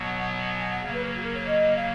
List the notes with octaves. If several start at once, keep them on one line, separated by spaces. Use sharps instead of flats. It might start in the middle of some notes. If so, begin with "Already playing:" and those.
Already playing: B2 F#3 B3 F#5
G#5
F#5
C#3 F#3 A#3 F5
B4
G#4
F#4
A#4
C#5
D#5
F5